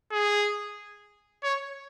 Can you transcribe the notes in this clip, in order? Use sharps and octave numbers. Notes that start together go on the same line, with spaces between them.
G#4
C#5